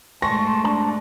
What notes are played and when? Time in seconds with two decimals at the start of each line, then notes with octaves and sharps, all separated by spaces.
0.22 G#2 A3 A5 C6 C#6 A#6
0.64 D4 A5